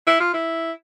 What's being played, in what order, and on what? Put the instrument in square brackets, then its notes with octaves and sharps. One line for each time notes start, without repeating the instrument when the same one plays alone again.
[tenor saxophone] E4
F4
E4